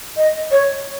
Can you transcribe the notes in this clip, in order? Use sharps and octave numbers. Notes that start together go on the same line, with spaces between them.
D#5
C#5